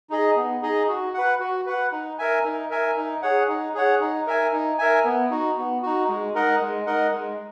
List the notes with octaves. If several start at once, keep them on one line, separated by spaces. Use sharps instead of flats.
D#4 G#4 D#5
B3
D#4 G#4 D#5
F#4
B4 F#5
F#4
B4 F#5
D#4
A#4 E5 G#5
D#4
A#4 E5 G#5
D#4
G#4 C#5 F#5
D#4
G#4 C#5 F#5
D#4
A#4 E5 G#5
D#4
A#4 E5 G#5
B3
D#4 F#4
B3
D#4 F#4
G#3
D#4 A#4 D#5 F#5
G#3
D#4 A#4 D#5 F#5
G#3